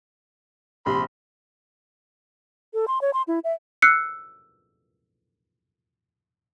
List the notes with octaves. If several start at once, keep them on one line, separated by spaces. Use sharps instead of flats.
A#1 C3 B5 C6
A4
C6
C#5
C6
E4
E5
E6 F#6 C7 C#7